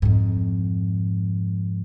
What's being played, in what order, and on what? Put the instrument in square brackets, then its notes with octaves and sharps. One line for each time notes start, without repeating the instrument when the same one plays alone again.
[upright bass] F2 G#2